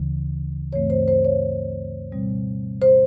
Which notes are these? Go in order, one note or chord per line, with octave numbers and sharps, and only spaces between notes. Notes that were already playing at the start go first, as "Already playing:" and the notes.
Already playing: D2 C#3 E3
G2 E3 A3 C4 C#5
C5
C5
C#5
B2 G3 C4
C5